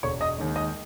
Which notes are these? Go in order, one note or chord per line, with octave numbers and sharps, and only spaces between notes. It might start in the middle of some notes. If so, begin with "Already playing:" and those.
E1 C#5 C#6
D#5 D#6
D#2 D#3 G#3
D#5 D#6